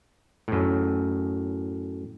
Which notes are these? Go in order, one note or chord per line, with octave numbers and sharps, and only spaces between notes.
F#2 A2